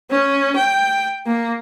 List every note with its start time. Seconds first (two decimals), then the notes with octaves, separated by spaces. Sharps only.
0.11 C#4
0.56 G5
1.26 A#3